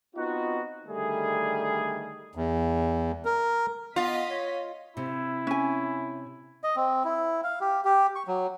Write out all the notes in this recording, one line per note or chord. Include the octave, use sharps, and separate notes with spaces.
B3 C4 D#4 F4 F#4
D3 D#3 G3 A3 G#4
E2
A#4
B3 F4 D#5 B6
C#5
C3 E4
C#4 G#5
D#5
C4
E4
F5
G4
G4
C#6
F#3